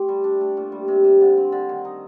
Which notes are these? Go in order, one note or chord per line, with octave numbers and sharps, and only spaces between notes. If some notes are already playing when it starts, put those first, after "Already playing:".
Already playing: A3 C4 G4
G3
D4
A3
A#2
G3
C3
C3
D3
C4
D3
D#3
D#4